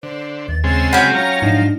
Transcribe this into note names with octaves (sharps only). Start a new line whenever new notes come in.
D3 C5
D#2 A6
C#3 G#3 C4 A6
F#3 F#5 G5 B5 F6 B6
C#4 F4 A#5 A#6
G#2 F3 D4 D#4